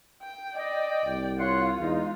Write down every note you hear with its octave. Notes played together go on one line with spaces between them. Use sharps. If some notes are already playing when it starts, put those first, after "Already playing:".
G5
D5 D#5 G5
C2
F4 C#5 F#5 C6
E2 G#3 D#4